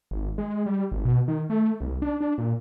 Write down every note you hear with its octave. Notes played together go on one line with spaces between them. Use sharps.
G#1
G#3
G3
G#1
B2
D#3
A3
C2
D4
D4
A#2